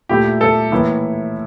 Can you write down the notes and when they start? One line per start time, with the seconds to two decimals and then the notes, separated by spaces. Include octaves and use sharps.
0.09 A#2 A3 E4 G4
0.41 A4
0.72 A2 E3 A#3 E4